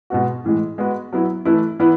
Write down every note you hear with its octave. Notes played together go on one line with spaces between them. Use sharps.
B2 G#3 B3 F#4
A2 E3 G#3
G#3 B3 F#4 B4
F#3 B3 E4
E3 A3 E4 B4
E3 B3 E4 B4